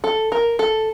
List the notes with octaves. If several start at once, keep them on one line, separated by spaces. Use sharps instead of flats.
A4
A#4
A4